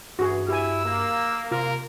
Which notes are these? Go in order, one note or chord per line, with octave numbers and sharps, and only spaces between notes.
G2 E3 F#4 G#4
E4 G4 G#5 E6
A#3
C3 F4 A#4